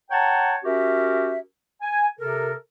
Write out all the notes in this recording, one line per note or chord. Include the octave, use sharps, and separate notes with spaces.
C#5 F#5 G5 A5 A#5
C#4 F#4 G4 A#4 E5
G#5
C3 A4 A#4